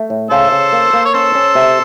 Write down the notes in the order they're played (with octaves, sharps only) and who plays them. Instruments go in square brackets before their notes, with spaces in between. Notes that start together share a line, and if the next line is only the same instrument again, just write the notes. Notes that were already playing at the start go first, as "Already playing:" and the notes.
Already playing: [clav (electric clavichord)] A3
A2
[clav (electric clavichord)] C#3 [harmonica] A4 C5
[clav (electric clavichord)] C#3
A#3
A#3
[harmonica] C#5
[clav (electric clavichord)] C#4 [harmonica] A4 C5
[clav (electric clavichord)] C#4
C3